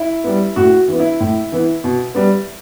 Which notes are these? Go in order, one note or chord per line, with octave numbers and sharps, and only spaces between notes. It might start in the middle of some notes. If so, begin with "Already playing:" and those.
Already playing: E4
G3 B3
A2 F#4
E3 B3
E4
A2
E3 B3
B2
G3 B3